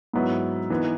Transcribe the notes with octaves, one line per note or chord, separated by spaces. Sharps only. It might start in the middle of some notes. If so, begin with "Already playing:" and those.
G#2 F#3 B3 E4
E3 B3 D#4